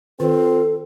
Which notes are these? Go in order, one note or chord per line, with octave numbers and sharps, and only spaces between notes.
D#3 C4 F4 A4